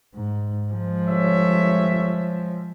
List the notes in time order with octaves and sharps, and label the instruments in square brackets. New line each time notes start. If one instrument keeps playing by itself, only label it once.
[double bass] G#2
F3 G#3
[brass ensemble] G1 C#5 E5